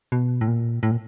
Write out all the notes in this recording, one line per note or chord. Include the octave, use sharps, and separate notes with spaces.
B2
A2
A#2
A2
A#2